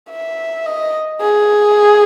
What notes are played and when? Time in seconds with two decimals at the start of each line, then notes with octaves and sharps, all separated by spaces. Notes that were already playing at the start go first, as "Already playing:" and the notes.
0.10 E5
0.66 D#5
1.21 G#4